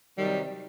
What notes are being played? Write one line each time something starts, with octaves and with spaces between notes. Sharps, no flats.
C3 D#3 F#3 G3